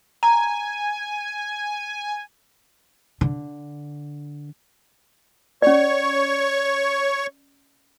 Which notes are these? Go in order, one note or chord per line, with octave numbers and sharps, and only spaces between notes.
G#5 A#5
D3
C#4 C#5 D5 C#6